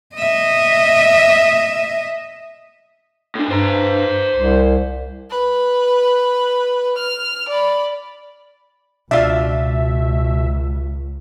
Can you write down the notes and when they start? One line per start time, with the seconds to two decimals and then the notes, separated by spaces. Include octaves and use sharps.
0.15 D#5 E5
3.35 A2 D4
3.51 G2 C5 A#5
4.35 C2
5.30 B4
6.97 F6
7.49 D5 B5
9.11 C#2 B2 D4 F4 E5